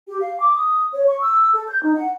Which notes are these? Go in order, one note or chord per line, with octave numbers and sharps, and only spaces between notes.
G4
F5
D6
D#6
C#5
C#6
E6
A4
G6
D#4
F#5